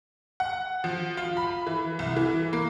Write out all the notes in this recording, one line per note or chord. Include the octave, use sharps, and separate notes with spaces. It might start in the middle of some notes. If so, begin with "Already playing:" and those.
F#5
F3
F4
B5
E3
C2
E3
A#3